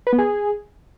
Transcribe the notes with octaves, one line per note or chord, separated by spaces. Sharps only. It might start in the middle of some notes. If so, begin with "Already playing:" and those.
B4
B3
G#4